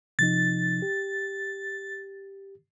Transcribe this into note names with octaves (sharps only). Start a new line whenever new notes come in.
C3 F3 D#4 A6
G4